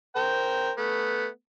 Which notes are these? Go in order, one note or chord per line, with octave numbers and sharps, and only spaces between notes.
A#4 C5 G5
A3 B3